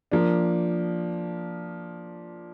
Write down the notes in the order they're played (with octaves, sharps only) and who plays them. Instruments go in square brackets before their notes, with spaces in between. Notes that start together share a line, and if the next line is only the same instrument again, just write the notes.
[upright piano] F3 A#3 D4